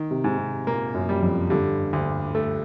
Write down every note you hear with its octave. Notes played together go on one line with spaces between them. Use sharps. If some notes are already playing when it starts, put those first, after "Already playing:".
Already playing: D#3
C3
G#2
C3
A#2 A#3
F#2
G3
F2
G2 D3
D2
A3